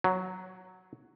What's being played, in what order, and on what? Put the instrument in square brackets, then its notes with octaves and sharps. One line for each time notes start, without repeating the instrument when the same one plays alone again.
[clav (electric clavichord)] F#3